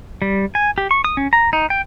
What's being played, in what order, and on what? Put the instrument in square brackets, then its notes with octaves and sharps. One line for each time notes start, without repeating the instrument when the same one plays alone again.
[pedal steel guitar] G3
G#5
G4
C#6
D#6
C#4
A#5
D#4
G5